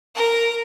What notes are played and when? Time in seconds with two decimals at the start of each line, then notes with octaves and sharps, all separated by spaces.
0.15 A#4